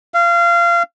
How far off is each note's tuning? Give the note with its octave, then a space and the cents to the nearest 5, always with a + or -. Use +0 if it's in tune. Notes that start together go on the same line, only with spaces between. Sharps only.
F5 -25